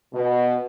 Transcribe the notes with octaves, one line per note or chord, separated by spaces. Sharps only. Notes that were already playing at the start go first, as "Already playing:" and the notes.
B2